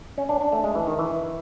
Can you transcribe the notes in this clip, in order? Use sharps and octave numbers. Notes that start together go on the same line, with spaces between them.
C#4
D4
D4
A3
G#3
E3
D#3
E3